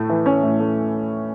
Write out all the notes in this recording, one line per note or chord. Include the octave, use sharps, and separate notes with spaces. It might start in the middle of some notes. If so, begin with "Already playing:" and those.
Already playing: A2 A3
E3
C#4
A2
A3